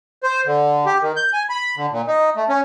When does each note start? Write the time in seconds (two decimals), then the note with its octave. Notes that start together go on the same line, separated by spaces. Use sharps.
0.23 C5
0.46 D3
0.86 G4
1.02 D#3
1.16 G6
1.33 G#5
1.49 B5
1.77 D3
1.92 A#2
2.07 D#4
2.36 A3
2.49 C#4